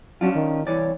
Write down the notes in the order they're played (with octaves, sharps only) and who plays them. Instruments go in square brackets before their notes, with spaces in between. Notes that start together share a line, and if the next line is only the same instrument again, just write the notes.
[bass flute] F#3 [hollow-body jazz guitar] C#4 D4 F4
[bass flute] D#3
[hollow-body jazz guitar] C2 E3 D5 [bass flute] C#5